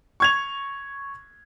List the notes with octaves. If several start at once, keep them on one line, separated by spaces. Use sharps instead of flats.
C#6 G#6 F7